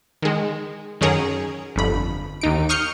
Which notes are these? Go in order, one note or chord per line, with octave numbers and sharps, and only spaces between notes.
D#3 G#3
F#2 D#3 C#4 G#4 A#4
G1 F2 B5
D#2 D#4 D7
C#6 D#6 F6 G6 C7 C#7